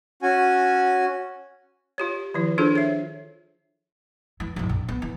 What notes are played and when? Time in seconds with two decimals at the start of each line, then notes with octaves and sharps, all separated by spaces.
0.22 C#4 F#4 G#5
1.98 F4 G4 C#5
2.34 D#3 F3 E4
2.58 D4 F4 G#4 A4 C5
2.76 C#5 E5
4.40 E3
4.56 A#1 F#2
4.69 A#1
4.89 B3
5.02 E3